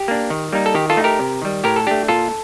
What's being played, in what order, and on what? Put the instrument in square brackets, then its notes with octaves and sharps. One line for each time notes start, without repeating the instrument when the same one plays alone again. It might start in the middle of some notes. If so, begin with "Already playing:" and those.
Already playing: [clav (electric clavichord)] G4
A#3 D4
D#3
G3 A#3 D#4
A4
D#3 G4
F4 A4
A3 D#4
G4 A#4
C3
D#3 G3
A2 G4 A#4
A4
A3 D4 G4
A#2 F4 A4